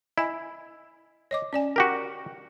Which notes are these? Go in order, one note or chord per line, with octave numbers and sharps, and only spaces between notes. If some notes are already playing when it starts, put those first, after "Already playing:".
E4 D#5 G#5
C#5 D#5 D6
C#4 D5 G#5
F#4 G4 A#4